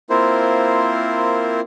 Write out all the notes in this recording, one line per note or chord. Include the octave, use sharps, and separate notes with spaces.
A#3 C4 E4 F4 A#4 C5